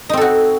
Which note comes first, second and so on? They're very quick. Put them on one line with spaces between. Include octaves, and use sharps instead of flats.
D#4 C4 A4 F#4